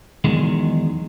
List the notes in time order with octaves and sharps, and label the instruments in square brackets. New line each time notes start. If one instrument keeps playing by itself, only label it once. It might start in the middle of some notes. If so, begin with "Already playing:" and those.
[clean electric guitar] E2 D#3 F#3 G#3